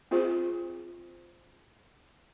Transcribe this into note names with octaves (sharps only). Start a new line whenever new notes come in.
C4 F4 G#4 C5